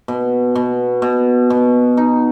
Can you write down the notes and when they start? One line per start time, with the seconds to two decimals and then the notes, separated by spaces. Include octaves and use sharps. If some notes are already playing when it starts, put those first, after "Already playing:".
0.08 B2
0.55 B2
1.02 B2
1.50 B2
1.97 D#4